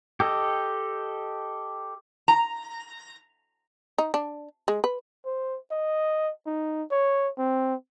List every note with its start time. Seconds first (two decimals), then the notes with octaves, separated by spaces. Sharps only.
0.20 G4 A4 D#5
2.28 A#5
3.98 D#4
4.14 D4
4.68 G#3
4.84 B4
5.26 C5
5.71 D#5
6.46 D#4
6.91 C#5
7.38 C4